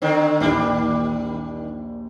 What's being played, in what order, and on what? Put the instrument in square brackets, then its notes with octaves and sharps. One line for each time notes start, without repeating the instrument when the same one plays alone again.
[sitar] D3 D#3 C4
[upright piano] A#1 D#2 [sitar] D#3 G3 D4